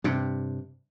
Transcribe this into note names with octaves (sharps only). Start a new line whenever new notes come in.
G2 C3